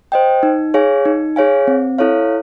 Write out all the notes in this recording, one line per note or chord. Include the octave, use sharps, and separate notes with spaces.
C5 D#5 G5
D#4
G#4 C#5 F5 G#5
D#4
G#4 C#5 F5 G#5
C4
E4 A4 C#5 F5